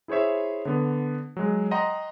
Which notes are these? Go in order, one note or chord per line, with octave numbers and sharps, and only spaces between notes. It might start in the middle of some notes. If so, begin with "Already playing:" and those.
E4 G#4 C5 C#5 E5
D3 B3
F#3 G#3
D#5 F#5 G5 A#5 C6